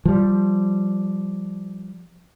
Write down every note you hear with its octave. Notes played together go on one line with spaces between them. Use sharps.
F3 G3